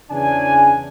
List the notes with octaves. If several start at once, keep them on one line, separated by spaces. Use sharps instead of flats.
E2 C#3 D4 G#5